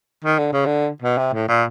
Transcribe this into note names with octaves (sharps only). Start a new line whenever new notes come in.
D#3
D3
C#3
D3
B2
C3
A2
A#2